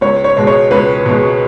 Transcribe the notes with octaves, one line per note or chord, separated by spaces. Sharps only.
C#2 C#5
C#5
B2 G#3
C#5
C#2 B4
B2 G#3